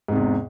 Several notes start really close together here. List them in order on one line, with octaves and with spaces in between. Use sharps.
G#2 C3 E2